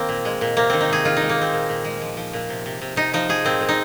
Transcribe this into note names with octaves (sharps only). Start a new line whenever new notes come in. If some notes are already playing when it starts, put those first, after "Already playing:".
Already playing: D#3 A#3 C4
A#2
G#3
A#2
C3 A#3
D#3 C4
D#4
C3 G#4
D#3 F4
D#4
G#3
A#3
D#3 C4
A#2
A#2
G#3
F3
F3
A#2
C3
C3
C3
C3 D#4
F3 D#4
F3 G#4
A#2 C4
A#2
D#4